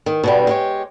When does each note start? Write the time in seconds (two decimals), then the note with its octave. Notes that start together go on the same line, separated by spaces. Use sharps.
0.06 D#3
0.24 B2 D3 G3
0.47 G#3 G4 C#5